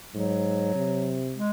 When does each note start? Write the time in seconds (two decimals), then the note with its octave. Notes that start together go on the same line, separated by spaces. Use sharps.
0.14 G#2 F#3
0.75 C3
1.35 G#3